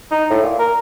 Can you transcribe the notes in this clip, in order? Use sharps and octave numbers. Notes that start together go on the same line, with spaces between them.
D#4
A2
A#2
A#4